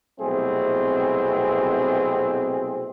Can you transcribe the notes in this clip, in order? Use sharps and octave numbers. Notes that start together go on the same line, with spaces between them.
C2 B2 F#3 A3 C4 G#4